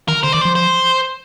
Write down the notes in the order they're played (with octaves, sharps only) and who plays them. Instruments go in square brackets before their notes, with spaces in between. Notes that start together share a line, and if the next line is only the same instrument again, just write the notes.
[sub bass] D#3 [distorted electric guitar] A#4
[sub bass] D3 [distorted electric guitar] C5
[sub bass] D#3 [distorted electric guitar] D5
[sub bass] F3 [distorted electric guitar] C5
[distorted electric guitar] C5